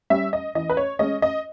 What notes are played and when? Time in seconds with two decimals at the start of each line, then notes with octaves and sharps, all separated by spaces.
0.10 G3 C#4 E5
0.33 D#5
0.55 E3 D#5
0.70 B4
0.77 C#5
0.99 G#3 C#4 D#5
1.22 D#5